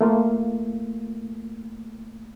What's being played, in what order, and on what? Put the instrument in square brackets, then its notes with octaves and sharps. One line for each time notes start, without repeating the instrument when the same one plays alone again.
[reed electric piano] A3 A#3 F4